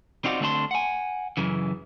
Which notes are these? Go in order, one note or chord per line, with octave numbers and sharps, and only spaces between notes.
C4 D#4 F4 F#4 D5
D3 A3 C4 D4 A5 C6
F#5 G#5
F#2 C#3 E3